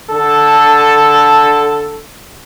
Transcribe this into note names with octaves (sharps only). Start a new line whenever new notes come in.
D3 A4